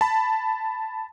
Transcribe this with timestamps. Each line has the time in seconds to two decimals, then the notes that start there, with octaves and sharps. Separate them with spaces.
0.01 A5 B5